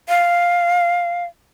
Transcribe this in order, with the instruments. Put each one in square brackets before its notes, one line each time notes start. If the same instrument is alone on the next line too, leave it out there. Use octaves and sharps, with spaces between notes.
[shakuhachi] F5